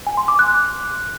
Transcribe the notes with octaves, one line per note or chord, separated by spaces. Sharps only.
G#5
C6
D6
F#6